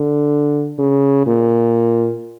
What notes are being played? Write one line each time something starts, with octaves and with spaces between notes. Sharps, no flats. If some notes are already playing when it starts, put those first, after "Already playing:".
Already playing: D3
C#3
A#2